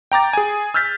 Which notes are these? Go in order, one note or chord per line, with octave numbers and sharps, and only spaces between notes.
G5 A#5 D6 A6
G#4 G#5
E6 F6 G6 A6 B6